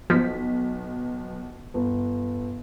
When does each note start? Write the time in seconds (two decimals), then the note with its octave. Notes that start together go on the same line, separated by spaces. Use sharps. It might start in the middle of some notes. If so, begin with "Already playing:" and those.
0.10 B1 F3 B6
1.74 G1